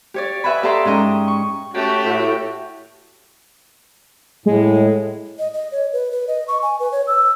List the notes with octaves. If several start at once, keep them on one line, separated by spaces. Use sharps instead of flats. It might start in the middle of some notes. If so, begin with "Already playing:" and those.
G4 C#5 D5
B4 D#5 E5 F#5 G#5 B5
G4 A4 D5 E5 A#5 C6
G#2 C#4 D#5 G5 A#5
C#6
A3 C#4 F#4 G4
A2 F#4
A2 G#3
D#5
D#5
C#5
B4
B4
D#5
C#6
G#5
B4
C#5
E6